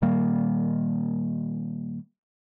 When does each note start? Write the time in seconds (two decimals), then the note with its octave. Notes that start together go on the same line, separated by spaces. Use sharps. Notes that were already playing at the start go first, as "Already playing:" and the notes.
0.02 A#2 D#3 G3 A#3